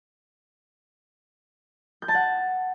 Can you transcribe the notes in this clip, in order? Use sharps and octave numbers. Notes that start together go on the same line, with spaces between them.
G6
A5
F#5